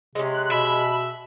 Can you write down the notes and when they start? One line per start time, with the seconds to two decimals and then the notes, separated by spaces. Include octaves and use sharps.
0.15 C3 G#3 C#4
0.34 F#6
0.51 B2 E5 B5